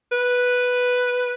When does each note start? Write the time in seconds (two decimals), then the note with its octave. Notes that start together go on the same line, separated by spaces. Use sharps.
0.12 B4